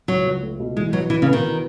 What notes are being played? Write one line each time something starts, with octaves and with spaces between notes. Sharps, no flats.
C#2 F#3
C#2
A3
B2
E3 G#3
F#3 B4
E3 F#4
C#3
B3
D#3